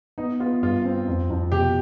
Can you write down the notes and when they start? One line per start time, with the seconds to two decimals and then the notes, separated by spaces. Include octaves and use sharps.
0.18 B3 D#4
0.40 B3 F4
0.62 G2 F4
0.85 C4
1.08 F2
1.30 F2
1.52 B2 G4